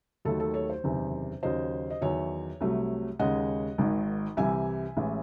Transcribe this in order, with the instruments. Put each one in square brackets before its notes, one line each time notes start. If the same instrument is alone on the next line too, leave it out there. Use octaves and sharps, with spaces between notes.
[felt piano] D#2 D#3 F#3 A3 A4
A4
A4 C#5
C5
F#1 E2 C3 D#3
D#2 C#3 F#3 C5 D#5
D#5
E2 D#3 F#3 C#5 E5
C2 C3 F#3 A3
D#2 C#3 G#3 D#5 F#5
G#1 G#2 D#3
C2 C3 E3 E5 G#5
A1 A2 E3 G#3